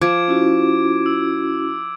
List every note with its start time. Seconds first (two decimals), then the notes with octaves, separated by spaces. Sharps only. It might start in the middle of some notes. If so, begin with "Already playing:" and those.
0.01 F3 D6 G#6 D7
0.28 C#4 E4 F#4
1.06 E6